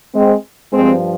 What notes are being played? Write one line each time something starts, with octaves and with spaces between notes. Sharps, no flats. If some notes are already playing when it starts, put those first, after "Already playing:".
G#3 C4
G2 F3 G#3 C4